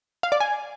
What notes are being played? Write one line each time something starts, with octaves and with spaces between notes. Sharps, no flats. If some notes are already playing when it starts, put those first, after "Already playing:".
F5
D5
G#5